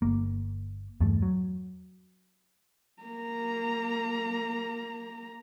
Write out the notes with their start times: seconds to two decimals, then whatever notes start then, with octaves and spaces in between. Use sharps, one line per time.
0.02 G1 A#3
1.01 E2 G2 A3
1.22 F#3
3.03 A#3 A#5